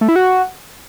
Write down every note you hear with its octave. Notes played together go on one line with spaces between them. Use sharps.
A3
E4
F#4